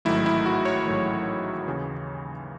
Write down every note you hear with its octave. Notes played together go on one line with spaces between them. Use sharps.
A1 G#2 D#3 F#3 A3 E4
E4
F#4
C#5
A1 G#2 D#3 F#3 A3
D#2 C#3 E3